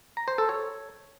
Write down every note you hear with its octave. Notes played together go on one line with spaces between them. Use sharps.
A#5
C5
A4
C#5